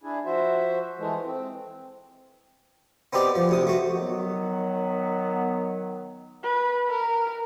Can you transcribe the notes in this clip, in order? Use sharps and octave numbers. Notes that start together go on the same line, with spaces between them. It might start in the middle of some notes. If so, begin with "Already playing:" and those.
D4 E4 G#4
F3 F#4 C5 E5
E3 G#3 A3
C4
B3 C4 D#4 G4 D5
F3
D2 C3 D#6
A3 F#4
D#3 F#3 B3
B4
A#4